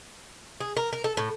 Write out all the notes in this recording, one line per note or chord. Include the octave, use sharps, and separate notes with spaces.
G#4
A#4
A#4
A4
A2